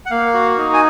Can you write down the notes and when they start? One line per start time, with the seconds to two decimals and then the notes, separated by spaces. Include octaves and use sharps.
0.06 F#5
0.11 A#3 F5
0.34 F#4
0.57 D#4
0.73 G#5